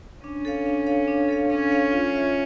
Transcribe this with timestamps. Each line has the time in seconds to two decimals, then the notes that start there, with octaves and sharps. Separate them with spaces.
0.24 C#4 D4
0.45 A4 C#5 F5
0.66 D4
0.86 A4 C#5 F5
1.08 D4
1.28 A4 C#5 F5
1.49 C#4 D4
1.71 A4 C#5 F5
1.91 F4
2.12 C#5 E5